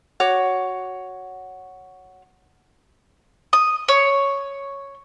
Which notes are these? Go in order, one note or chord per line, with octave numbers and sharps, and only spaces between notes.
F#4 C#5 D6
D#6
C#5